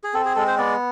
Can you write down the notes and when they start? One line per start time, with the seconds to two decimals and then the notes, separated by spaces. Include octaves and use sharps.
0.04 G#4
0.14 C4 A4
0.25 G#4
0.36 G#3 A4
0.47 C5
0.58 B3 D5